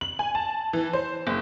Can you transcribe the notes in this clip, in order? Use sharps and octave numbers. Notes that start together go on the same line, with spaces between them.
F#7
G#5
A5
E3
C5
F#1